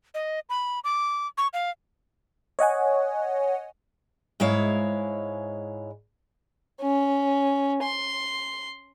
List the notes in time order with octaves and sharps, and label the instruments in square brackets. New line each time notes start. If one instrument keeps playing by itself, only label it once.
[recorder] D#5
B5
D6
C#6
F5
[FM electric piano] C#5 D#5 F#5 G#5
[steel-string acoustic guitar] G#2 G#3 E4 C#5 F5
[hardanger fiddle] C#4
C6